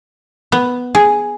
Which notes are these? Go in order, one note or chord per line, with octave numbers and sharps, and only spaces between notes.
B3
G#4